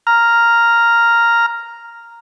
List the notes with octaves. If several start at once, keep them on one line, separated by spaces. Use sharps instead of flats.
A#5 F6